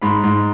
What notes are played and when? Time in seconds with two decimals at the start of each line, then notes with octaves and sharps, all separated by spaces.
0.02 G#2 B5
0.23 G#2